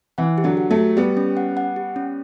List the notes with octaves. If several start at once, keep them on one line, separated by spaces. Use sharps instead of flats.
E3 F#5
G4
D3 F#3
G4
F#3 A3
G4
G3 B3 G4
C#4
F#5
F#5
G4
C#4